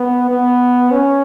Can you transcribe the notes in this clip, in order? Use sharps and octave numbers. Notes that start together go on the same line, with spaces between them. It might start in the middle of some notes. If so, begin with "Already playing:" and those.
Already playing: B3
B3
C#4